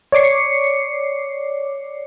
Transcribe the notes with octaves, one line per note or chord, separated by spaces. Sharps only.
C#5 D5 D6 C7 C#7